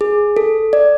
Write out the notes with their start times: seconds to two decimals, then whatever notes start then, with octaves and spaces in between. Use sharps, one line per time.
0.01 G#4
0.37 A4
0.73 D5